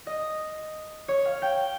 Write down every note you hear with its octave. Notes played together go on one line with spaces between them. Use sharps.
D#5
C#5
F5
G5